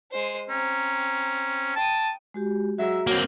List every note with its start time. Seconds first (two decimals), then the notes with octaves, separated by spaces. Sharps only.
0.11 G#3 C5
0.50 C4 C#4 A#5
1.76 G5 A5 D#6
2.34 G#3 F#4 G4
2.78 F#3 G#3 F#4 E5 A#5
3.07 F#3 A#3 C4